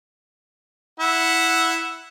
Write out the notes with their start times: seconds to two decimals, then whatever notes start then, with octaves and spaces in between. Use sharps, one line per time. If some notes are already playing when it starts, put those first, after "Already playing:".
1.00 E4 F#5